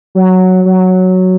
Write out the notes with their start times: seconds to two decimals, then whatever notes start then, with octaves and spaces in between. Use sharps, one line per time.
0.15 F#3
0.65 F#3